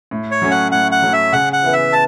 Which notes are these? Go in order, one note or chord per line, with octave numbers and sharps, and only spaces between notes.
A2
C#5
F#3 A3 C#4
F#5
A2 F#5
F#5
F#3 A3 C#4
E5
C#3 F#5
F#5
E3 B3 E4 B4
E5
A5